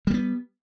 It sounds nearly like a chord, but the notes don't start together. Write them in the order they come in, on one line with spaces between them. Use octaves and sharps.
G3 A#3 B3